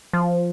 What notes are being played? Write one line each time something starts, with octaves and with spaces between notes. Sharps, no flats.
F3